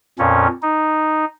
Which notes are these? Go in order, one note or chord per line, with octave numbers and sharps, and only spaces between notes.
F2 A#2 C#4
D#4